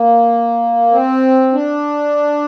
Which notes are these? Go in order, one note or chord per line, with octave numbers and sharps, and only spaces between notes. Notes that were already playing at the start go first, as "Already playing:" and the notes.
Already playing: A#3
C4
D4